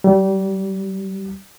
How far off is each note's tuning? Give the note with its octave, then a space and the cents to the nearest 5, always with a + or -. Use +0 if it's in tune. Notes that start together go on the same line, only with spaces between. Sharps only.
G3 -25